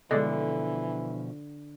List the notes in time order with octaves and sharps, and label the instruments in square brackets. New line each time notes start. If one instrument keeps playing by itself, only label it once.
[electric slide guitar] B2 F3 [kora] D3 [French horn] E3 [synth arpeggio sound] G#3 D5 D#5